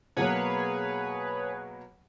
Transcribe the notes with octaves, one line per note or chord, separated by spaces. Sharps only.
B2 F#3 A#3 G#4 B4 C#5